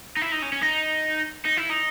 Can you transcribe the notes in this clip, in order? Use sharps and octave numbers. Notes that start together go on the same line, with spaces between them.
D#4
E4
D#4
C#4
C#4
D#4
D#4
E4
D#4